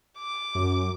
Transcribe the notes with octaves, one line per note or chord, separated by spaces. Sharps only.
D6
F#2